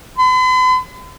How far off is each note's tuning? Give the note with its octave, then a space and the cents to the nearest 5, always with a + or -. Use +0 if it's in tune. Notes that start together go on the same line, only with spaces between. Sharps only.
B5 +45